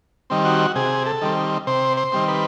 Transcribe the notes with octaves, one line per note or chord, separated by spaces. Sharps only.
D#3 G3 C4
F#4
C3 G#4
A4
D#3 G3 C4
C3 C5
C5
D#3 G3 C4
B4